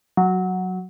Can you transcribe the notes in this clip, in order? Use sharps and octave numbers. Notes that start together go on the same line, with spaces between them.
F#3